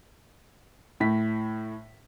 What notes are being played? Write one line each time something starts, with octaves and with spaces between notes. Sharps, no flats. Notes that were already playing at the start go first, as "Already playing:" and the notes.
A2 B6